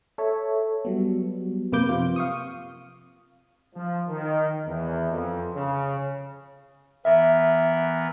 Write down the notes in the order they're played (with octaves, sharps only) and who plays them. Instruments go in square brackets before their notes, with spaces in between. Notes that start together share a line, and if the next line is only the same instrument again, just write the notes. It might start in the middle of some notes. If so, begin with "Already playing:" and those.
[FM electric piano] A4 C#5 E5
F#3 G3 B3
F#2 C3 A#3 B4 D6 G6
C3 F3 F4
F5 C#6 D#6
[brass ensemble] F3
D#3
E2
F2
C#3
[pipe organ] E3 B3 A#4 [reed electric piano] E5